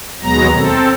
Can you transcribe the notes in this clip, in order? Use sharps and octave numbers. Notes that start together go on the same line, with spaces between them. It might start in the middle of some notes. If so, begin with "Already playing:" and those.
D#2 B2 F#3 G#3 B3 A#5
C4 A4